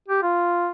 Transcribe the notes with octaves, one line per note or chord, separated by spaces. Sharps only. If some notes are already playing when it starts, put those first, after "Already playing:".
G4
F4